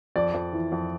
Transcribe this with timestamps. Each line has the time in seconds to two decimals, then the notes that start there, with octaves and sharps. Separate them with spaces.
0.16 F2 D5
0.34 F2
0.53 E3
0.72 F2